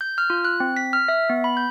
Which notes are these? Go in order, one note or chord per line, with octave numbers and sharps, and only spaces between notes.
G6
F6
F4
F#6
C4
B6
F6
E5
B3
B5
G6